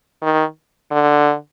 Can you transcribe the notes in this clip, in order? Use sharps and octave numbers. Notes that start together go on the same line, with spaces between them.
D#3
D3